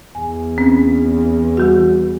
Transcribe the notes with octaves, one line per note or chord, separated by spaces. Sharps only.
E2 G#5
C4 C#4
E3 G3 F#4